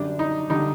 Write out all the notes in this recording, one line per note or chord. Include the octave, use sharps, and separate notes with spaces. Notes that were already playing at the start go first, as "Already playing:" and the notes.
Already playing: F#2 D3 G3 D4
D#4
D3 G3 D#4